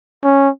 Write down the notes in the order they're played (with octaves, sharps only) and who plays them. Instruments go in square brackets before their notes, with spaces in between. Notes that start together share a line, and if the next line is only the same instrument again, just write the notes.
[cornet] C#4